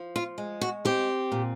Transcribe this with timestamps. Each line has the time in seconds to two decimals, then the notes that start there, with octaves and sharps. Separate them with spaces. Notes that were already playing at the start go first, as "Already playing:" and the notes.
Already playing: F3
0.16 F4
0.38 G#3
0.61 F#4
0.85 C4 G4
1.32 A#2